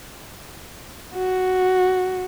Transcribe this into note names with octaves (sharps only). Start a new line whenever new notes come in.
F#4